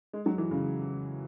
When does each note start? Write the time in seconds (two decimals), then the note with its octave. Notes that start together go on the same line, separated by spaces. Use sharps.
0.13 G#3
0.26 F#3
0.38 E3
0.51 C#3